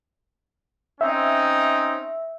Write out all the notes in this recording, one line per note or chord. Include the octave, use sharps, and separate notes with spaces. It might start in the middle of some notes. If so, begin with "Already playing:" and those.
C4 C#4 D#4 E5